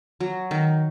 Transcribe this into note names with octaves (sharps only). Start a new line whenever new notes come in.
F#3
D#3